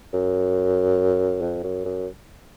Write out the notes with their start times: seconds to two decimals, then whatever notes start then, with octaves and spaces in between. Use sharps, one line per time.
0.13 F#2
1.41 F2
1.63 F#2
1.85 F#2